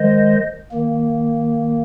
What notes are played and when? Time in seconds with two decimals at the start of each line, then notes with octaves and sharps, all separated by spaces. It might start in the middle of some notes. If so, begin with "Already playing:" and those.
Already playing: D#3 G#3 C5 D#5
0.72 D#3 A#3